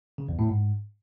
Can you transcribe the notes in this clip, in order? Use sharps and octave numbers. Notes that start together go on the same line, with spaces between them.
C#3
E2
A2
G#2